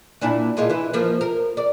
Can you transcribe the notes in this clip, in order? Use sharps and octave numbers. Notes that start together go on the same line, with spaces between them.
A#2 D4 E4
A#2 G#3 F4
E3 E4
F3 A#3
A#4
D5